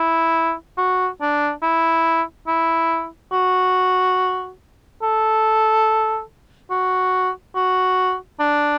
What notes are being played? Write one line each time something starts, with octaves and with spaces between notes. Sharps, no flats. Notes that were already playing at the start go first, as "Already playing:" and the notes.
Already playing: E4
F#4
D4
E4
E4
F#4
A4
F#4
F#4
D4